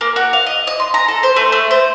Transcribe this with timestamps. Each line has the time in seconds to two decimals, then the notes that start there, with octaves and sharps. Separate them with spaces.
0.01 A#3
0.16 F#4
0.33 F5
0.46 D#5
0.67 D#5
0.80 C6
0.94 A#5
1.08 A4
1.23 C5
1.36 A3
1.52 A3
1.71 C5